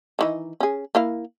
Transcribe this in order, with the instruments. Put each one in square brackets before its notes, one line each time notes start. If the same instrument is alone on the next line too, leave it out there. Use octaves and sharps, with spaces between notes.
[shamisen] D#3 E3 D#4
C#4 G#4
A#3 E4 F5